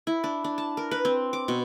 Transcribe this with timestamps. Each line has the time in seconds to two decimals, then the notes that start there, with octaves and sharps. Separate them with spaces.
0.07 E4
0.24 D4
0.44 D4
0.58 A5
0.77 A#4
0.91 B4
1.05 C4
1.33 D6
1.48 B2